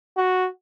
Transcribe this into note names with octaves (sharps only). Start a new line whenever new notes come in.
F#4